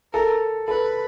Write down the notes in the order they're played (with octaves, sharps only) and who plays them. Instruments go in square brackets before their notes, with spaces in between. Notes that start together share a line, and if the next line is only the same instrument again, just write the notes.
[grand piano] A4 [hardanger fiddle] A#4
[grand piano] A4 [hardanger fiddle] B4